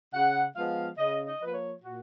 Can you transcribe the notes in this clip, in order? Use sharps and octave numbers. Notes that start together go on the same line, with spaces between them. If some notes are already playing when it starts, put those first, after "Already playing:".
C#3 F#5
F3 G#3 B3 F5
C#3 D#5
D#5
F3 A#3 B4
C#5
A#2 F#4